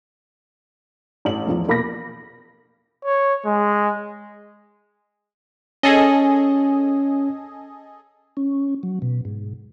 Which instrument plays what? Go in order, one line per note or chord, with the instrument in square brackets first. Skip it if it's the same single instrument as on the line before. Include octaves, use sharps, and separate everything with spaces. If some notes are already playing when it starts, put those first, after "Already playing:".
[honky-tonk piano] A1 F#7
E2 F3
B2 A#3 B5 D6 A#6
[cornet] C#5
G#3
[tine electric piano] C#4 [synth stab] G#4 A4 D#5
[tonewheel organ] C#4
F#3
B2
G#2